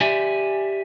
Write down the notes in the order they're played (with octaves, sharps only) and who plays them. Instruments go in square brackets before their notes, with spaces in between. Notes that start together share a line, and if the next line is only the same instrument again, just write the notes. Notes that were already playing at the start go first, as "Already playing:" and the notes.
[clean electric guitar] G4 D5 E5 G#5